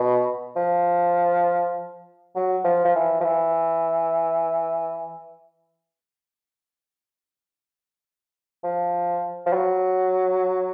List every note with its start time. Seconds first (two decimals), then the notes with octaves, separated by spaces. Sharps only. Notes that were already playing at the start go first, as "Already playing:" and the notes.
Already playing: B2
0.56 F3
2.36 F#3
2.64 F3
2.85 F3
2.95 E3
3.20 F3
3.24 E3
8.64 F3
9.46 F3
9.53 F#3